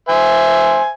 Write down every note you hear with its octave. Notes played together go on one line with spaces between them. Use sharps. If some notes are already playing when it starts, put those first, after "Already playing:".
C5 E5 G#5